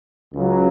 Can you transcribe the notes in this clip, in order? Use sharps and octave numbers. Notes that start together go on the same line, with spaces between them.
C#2 C#3 F#3